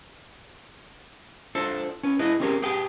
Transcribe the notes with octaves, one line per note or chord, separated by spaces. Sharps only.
D4 F4 A4 C5
C#4 B4
E4 G#4 B4 D#5
C4 C#4 G4 G#4 A#4
G4 G#4 B4 G5